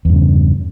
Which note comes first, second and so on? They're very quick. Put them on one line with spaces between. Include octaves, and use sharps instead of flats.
E2 G2 C#3